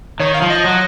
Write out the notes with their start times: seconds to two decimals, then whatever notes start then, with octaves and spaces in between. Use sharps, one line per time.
0.20 D#3 C#5
0.34 F5
0.42 F3
0.50 D#5
0.65 F#3